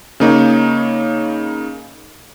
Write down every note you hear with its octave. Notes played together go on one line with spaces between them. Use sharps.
C#3 A#3 D#4 C#5